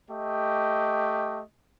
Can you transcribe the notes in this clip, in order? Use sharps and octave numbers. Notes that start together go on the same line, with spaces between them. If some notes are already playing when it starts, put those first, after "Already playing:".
A3 G4 D#5